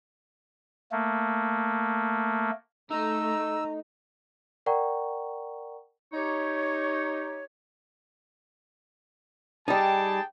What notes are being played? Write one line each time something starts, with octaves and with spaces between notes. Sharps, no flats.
A3 A#3
A3 D#4 A#5 E6
A#4 D5 F#5 G5 A#5 C#6
D#4 G4 C#5
G3 D#4 G#4 G5 A5